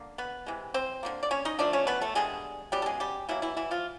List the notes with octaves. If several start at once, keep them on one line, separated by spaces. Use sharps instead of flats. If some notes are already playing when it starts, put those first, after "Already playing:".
Already playing: D3 A#3
B3 B4
C3 E3 G#3
C4 C5
D3 G3 A#3
D5
C#4 C#5
D#4 D#5
D3 F3 A3 D4 D5
C#4 C#5
B3 B4
A3 A4
D3 G3 G#3 B3 G#4
C#3 F#3 G3 B3 G4
A4
G#3 G#4
G3 G4
B2 E3 F#3 A#3 E4
E3 E4
E3 E4
F3 F4